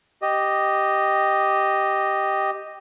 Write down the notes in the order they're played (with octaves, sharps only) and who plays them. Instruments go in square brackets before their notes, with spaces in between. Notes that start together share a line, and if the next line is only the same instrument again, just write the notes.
[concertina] G4 D#5